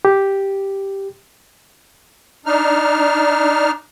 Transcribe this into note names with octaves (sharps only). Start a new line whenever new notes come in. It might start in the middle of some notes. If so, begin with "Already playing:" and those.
G4
D4 D#4 F6